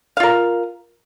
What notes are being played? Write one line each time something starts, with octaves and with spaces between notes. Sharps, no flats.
F4 A#4 F5